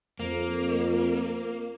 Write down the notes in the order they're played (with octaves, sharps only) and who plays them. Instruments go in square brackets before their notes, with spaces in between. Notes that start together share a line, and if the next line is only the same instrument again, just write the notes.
[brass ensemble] F2 [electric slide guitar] A#3